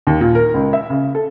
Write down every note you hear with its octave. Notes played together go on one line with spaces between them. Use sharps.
D#2
A#2
A#4
C#2
E5
C#3
A4